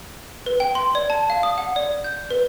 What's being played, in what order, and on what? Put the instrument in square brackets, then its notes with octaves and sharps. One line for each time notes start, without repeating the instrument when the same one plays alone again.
[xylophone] B4
G5
C6
D5
A5
F5
D#6
F#5
D5
G6
B4